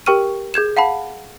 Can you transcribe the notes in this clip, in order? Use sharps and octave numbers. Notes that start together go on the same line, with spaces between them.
G4 A#4 G5 C#6 F6 D#7
G#4 G6 G#6 E7
F5 F#5 A5 B5